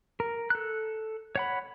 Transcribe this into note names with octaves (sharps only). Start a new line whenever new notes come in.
A#4
A4 F#6
C#5 F#5 B5